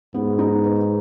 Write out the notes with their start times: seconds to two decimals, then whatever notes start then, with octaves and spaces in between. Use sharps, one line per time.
0.14 G#2 B3
0.39 D#4
0.64 B4